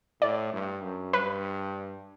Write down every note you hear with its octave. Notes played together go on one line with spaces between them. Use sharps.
A2 D5
G2
F#2
G2 B4